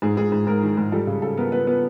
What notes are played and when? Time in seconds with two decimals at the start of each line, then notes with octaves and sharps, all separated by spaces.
0.02 G#2 G#4
0.17 G#2 G#4
0.32 G#2
0.47 G#2 A#4
0.62 D#3
0.77 G#2
0.92 G3 A4
1.07 C#3 G#4
1.22 C#3 A4
1.37 B3 A#4
1.52 B3 B4
1.67 B3 B4